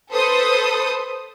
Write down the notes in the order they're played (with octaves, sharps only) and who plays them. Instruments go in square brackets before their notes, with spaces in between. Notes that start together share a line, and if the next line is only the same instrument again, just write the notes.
[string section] A4 B4 C5 D#6